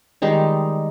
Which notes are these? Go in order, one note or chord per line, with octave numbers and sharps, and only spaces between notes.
D#3 G3 G#3 D#4